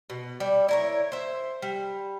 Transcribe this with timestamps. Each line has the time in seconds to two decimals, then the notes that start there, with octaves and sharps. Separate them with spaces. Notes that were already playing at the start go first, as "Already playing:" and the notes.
0.10 B2
0.40 G3 D5
0.69 E4 A#4 C#5
1.12 C5 E5
1.62 G3